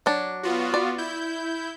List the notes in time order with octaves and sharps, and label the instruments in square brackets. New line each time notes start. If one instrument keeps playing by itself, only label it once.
[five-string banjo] F#3 D4
[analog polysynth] B3 F4 F#4
[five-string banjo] D5
[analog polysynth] E4 G6